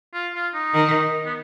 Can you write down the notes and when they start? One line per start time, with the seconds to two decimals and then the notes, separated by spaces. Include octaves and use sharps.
0.14 F4
0.34 F4
0.54 D#4
0.74 D#3
1.26 B3